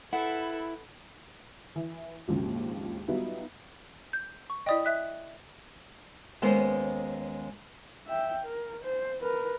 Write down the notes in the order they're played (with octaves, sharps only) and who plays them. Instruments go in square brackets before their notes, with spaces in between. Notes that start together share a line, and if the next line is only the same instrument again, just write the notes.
[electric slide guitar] E4 [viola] A4 B4 [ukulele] F#5
[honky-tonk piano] E3
A#1 D#2 G#2 C#3 F3 F#3
F#3 G3 B3 D#4 F4 E5
[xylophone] G6
C#6
[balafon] E4 D5 D#5 [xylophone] G5 D#6
[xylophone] E5 F#6 B6
[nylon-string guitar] D#2 G#3 B3 C#4 C5
[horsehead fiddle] E5 G5
A#4
C5
A#4 B4